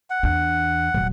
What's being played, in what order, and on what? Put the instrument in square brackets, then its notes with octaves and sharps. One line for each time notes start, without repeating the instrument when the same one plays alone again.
[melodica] F#5
[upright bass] E2 D4
D#1 F#3